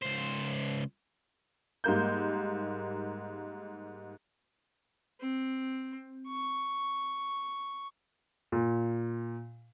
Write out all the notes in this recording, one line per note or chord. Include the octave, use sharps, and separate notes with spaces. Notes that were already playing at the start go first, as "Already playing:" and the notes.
C#2 C5
G#2 G3 A#3 G6
C4
C#6
A#2